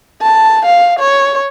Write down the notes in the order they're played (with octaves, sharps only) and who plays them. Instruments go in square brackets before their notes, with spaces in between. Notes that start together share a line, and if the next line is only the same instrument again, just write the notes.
[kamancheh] A5
F5
C#5